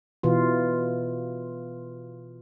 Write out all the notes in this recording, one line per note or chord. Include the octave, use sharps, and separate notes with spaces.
B2 E3 F4